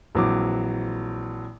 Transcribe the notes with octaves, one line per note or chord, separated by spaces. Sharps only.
A#1 E3 F#3 C4 D6